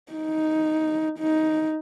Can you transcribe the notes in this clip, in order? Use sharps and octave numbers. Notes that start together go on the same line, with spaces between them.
D#4
D#4